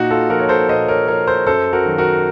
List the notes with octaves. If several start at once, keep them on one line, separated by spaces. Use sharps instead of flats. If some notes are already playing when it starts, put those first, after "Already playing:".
Already playing: A#2 D#4 F#4
F4 A4
F3 F#4 A#4
C#5
A4 C5
A#2 C5 D#5
A#4 C#5
F3 A#4 C#5
A4 C5
F#2 A4 C5
F#4 A#4
D#3 F#3
F#4 A#4